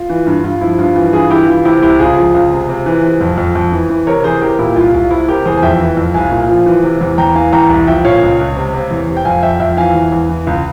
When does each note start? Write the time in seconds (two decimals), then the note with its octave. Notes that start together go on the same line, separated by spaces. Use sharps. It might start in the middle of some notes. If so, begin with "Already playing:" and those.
Already playing: F4
0.10 E3
0.27 G2
0.44 G2 F4
0.61 F3 E4
0.79 G2 F4
0.95 E3 F4
1.13 G2 F4 G#4
1.31 E3 E4 G4
1.48 E3 F4
1.65 C3 E4 G4
1.82 C2 E4 G4
1.99 C#2 F4 G#4
2.17 F3
2.34 C#2
2.51 C3
2.69 C3
2.86 E3
3.03 C3
3.21 F2
3.38 F2
3.55 F2
3.72 E3
3.90 E3
4.07 C3 A#4 C#5
4.24 E3 G#4 C5
4.42 E3 G4 A#4
4.59 A#2 E4 G4
4.76 C2 F4
4.94 C2 F4
5.11 C3 E4
5.28 C3 G4 A#4
5.46 E2 G#4 C5
5.57 G#5
5.63 F2 E5 G5
5.80 E3
5.97 F2
6.14 C2 F5 G#5
6.32 A#2
6.49 F3
6.66 E3
6.83 C3
7.01 E2
7.18 E2 G5 A#5
7.35 E3 F5 G#5
7.52 E2 G5 A#5
7.69 C2
7.87 F3 E5 G5
8.05 A#2 C#5 F5
8.22 C#2
8.39 C#2
8.56 C3
8.74 C3
8.91 E2
9.09 C3
9.17 G5
9.25 F2 F5 G#5
9.43 F2 E5 G5
9.60 F2 E5 G5
9.77 E3 F5 G#5
9.95 E2
10.12 E2
10.29 E3
10.47 C#2